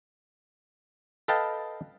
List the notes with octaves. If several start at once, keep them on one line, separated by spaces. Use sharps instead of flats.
A4 B4 D#5 F5 G5 A5